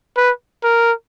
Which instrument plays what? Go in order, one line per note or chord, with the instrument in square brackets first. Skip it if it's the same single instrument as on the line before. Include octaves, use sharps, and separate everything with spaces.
[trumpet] B4
A#4